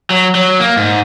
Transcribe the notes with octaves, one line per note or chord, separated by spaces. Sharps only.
F#3
F#3
A#3
G#2